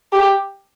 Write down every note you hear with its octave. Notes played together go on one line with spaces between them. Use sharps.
G4